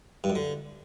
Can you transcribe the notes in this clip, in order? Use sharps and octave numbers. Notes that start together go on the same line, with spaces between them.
G2
F#2
D3